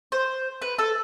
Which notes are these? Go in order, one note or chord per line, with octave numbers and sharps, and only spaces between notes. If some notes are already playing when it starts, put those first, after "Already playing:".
C5
B4
A4